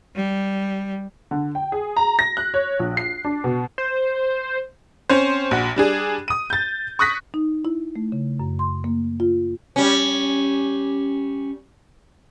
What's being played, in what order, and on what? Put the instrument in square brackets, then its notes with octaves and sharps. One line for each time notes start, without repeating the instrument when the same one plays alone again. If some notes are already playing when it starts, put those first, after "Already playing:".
[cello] G3
[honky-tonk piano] D3
G5
G#4
A#5
A#6
F#6
C#5
A#1
C7
D4
B2
[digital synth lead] C5
[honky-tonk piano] C4 C#4 C5
A#1 F#4
G3 D4 G#4
D#6 D#7
G6 A6
C#6 D#6 F#6 A#6 B6
[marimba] D#4
E4
A3
C#3
F#2
C6
A#3
F4
[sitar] G3 C#4